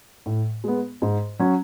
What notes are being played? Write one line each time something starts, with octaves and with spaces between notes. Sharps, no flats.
A2
G#3 B3
G#2
F#3 C#4